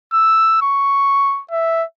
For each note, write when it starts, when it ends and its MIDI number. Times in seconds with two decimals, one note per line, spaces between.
0.13 0.58 88
0.62 1.41 85
1.51 1.84 76